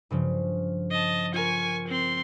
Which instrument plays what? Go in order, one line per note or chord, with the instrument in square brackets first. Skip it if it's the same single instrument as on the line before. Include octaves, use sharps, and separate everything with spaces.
[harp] G2 C#3 F3
[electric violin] D#5 A5
[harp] F4 A#4 [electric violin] G#5 C#6
[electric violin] C4 C6